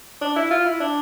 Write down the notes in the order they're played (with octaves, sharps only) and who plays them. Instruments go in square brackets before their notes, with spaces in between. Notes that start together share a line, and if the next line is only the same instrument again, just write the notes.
[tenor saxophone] D4
E4
F4
E4
D4